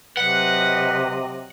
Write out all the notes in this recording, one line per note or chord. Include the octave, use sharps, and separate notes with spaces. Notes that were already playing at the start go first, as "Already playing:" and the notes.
C3 F#3 B4 D#5 F#5